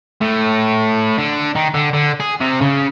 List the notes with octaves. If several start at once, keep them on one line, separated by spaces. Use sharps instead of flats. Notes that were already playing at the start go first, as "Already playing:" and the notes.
A2
D3
D#3
D3
D3
G#4
C3
C#3